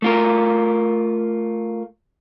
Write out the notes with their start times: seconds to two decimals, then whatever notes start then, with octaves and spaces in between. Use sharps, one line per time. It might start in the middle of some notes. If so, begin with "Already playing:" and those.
0.02 A3 F4 A#4